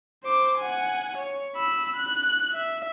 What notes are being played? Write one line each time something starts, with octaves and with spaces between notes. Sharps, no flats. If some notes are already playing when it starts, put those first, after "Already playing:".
C5 D6
F#5 G#5
C#5
B5 E6
F#6
E5